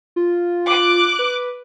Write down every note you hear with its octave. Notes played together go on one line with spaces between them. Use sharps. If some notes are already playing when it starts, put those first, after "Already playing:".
F4
D6 F#6
B4